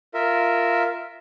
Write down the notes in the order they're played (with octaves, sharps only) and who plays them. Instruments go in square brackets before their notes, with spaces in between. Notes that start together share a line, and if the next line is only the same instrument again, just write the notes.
[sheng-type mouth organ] F4 A#4 E5